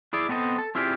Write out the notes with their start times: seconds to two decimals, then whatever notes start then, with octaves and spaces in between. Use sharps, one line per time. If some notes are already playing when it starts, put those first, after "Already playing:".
0.13 E4 G#4 D5
0.29 B3 C4 A4 D#5
0.58 A4
0.75 C4 E4 F4 G4 G#4 D5